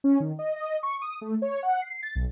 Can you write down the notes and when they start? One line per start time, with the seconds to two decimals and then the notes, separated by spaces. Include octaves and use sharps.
0.04 C#4
0.20 D#3
0.39 D#5
0.56 D#5
0.83 C#6
1.02 D#6
1.21 A3
1.42 C#5
1.63 F#5
1.82 C7
2.03 A6
2.15 B1